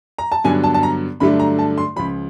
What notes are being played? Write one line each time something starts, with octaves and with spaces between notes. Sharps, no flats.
A#5
A5
G2 D3 F#3 B3 D4 G#5
A5
A5
A#5
G2 D3 F#3 A3 D4 B5
A#5
A5
C6
C#2 C#3 F3 B5